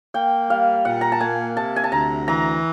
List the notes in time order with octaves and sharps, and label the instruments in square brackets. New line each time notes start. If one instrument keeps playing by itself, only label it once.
[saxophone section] A#3 [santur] G5
[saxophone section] G3 [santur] F5
[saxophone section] A#2 [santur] F#5
[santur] A#5
A5
[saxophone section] A#3 [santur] G#5
[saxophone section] C3 [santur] A5
[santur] G#5
A5
[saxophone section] D2 [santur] A#5
[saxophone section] E3 [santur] A#5